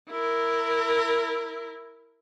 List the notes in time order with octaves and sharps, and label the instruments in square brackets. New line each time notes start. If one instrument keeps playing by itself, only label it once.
[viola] E4 A#4